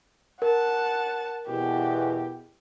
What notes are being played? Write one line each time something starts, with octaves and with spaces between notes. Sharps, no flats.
A#4 F#5 A5
E2 B2 G4